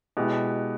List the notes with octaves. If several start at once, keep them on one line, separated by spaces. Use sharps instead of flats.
B2 G#3 B3 E4 G4